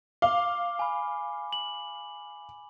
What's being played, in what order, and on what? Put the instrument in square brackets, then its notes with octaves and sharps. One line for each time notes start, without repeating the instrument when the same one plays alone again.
[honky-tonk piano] F5 [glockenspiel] D6 G7
[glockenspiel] G#5 B5
F#7